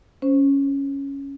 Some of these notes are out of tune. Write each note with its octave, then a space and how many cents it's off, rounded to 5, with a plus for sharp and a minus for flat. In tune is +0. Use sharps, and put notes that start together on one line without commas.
C#4 +0 C5 +0